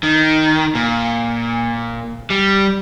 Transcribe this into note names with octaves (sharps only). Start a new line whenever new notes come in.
D#3
A#2
G3